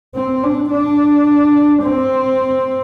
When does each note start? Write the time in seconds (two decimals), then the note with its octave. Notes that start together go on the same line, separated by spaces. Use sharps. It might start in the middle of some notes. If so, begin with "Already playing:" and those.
0.15 C4
0.43 D4
0.71 D4
1.84 C4